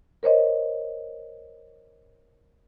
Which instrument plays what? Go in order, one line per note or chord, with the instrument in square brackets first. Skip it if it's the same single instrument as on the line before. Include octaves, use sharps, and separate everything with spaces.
[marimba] A#4 C5 C#5 D#5